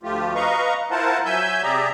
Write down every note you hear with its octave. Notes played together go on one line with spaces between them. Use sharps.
D2 F3 A3 F4 G4
B4 D#5 F5 A#5 C#6
E4 F4 A#4 C5 F#5 A5
F#3 E5 G#5 E6 G6
C3 G4 G#4 D5 E5 A#5